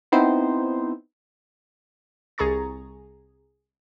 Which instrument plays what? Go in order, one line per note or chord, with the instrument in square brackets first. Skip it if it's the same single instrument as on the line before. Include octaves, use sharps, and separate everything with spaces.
[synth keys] B3 C4 D#4 E4 C5
[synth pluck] C2 G#4 A#5 C#6 A6